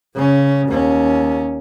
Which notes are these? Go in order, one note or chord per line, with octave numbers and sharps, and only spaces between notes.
C#3 C#4
D#2 C#4